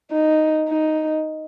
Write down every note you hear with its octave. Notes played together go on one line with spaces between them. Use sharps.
D#4
D#4